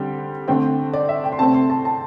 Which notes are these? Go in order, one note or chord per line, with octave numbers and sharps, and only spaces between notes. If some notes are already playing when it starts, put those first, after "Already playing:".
Already playing: D3 G3 C4 G5
D3 A3 C4 G5
D5
E5
G5
C6
C3 A3 C4 A5
C6
A5
A5